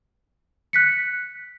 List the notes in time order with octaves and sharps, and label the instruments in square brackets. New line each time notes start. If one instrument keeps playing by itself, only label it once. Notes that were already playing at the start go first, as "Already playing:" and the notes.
[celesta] F#6 B6 C#7